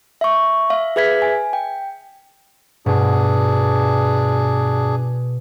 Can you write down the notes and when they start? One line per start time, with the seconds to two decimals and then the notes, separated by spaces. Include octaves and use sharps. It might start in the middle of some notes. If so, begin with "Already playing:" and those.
0.21 E5 C#6
0.70 E5 F5
0.96 G#4 B4 E5 G#6 B6
1.22 G#5
1.53 G5
2.86 G2 B2 D4 G#4